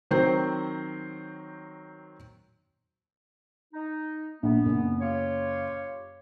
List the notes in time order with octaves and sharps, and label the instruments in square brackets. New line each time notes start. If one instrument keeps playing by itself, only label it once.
[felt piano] D#3 F#3 C4 C5
[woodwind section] D#4
[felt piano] A#1 [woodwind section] B3
[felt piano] F#1
[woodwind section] F4 G4 C#5